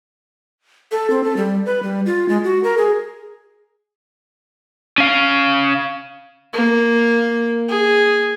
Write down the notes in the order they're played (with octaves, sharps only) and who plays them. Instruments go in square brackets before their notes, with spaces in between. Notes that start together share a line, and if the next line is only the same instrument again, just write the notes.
[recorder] A4
C4
A4
G3
B4
G3
F4
G#3
F#4
A#4
G#4
[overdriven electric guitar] C#4 F5
[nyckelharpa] A#3
G#4